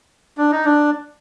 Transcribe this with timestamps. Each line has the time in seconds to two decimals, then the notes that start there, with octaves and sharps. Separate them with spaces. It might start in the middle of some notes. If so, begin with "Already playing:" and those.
0.38 D4
0.52 D#4
0.65 D4